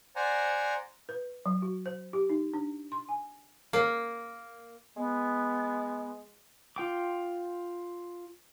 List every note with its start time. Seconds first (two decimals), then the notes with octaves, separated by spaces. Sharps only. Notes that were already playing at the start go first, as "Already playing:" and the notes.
0.16 C5 D5 F#5 G#5 A#5
1.09 B4
1.46 F#3
1.62 F#4
1.86 C5
2.13 G4
2.29 D#4
2.54 D4
2.92 C6
3.09 G#5
3.73 A#3
4.97 G#3 B3
6.76 F4 G5 D6